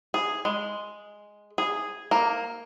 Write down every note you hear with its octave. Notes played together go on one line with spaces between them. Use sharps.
G#4
G#3
G#4
A#3